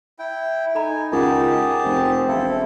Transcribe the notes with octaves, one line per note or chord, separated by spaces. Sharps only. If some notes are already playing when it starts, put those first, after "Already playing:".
E4 G5
D#4 A4 G#5 A#5 B5
C#2 G4 G#4 A#4 F#5 A5
F1 C4
E1 E4 A4 F5